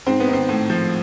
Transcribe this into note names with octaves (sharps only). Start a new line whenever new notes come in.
G#2 C4
B3
D#3
C4
A2
F3